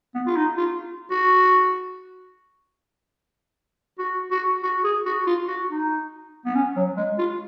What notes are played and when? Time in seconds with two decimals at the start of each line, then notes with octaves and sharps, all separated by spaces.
0.15 B3
0.26 F4
0.37 D#4
0.58 F4
1.11 F#4
3.99 F#4
4.31 F#4
4.63 F#4
4.84 G#4
5.06 F#4
5.27 F4
5.48 F#4
5.70 D#4
6.46 B3
6.55 C#4
6.76 F#3
6.97 G#3
7.19 F4